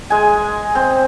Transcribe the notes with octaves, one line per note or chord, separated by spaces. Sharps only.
G#3 G#5
C4